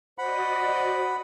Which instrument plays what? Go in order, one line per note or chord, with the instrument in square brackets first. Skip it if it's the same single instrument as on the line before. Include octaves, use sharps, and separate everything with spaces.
[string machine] F#4 D5 D#5 [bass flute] C5 [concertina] F#5 B5